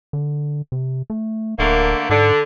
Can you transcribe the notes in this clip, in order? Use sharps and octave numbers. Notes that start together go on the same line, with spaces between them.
D3
C3
A3
D1 D3 A3 A#3
G#2 D3